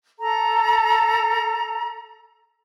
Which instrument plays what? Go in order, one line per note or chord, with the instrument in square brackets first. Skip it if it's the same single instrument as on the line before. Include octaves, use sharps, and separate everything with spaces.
[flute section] A4 A#5